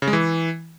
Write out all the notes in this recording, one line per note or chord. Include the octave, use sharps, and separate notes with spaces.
C#3
G#3
E3